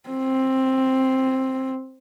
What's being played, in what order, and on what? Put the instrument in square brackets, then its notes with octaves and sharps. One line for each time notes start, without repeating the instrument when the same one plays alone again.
[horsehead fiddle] C4